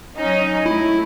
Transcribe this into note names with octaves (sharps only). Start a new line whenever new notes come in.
F#3 C#4 D#4
A3 E4